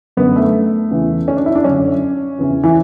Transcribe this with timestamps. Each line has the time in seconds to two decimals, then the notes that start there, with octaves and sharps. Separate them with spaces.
0.17 F#2 D3 B3
0.36 A3
0.91 E2 C#3 E3
1.28 C#4
1.37 D4
1.46 E4
1.55 D4
1.64 F#2 D3 C#4
2.39 E2 C#3 E3
2.64 E3